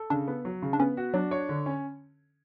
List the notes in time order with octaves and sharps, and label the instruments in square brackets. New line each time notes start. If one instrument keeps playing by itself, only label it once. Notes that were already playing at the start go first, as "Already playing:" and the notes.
Already playing: [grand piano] A4
[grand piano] C#3 [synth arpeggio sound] D4
[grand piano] B3
F#3
C#3
[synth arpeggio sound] D4
[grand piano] B3 [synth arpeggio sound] C#4
[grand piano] F#4
[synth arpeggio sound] F#3 [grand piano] D4
[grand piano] C#5
D3
C#4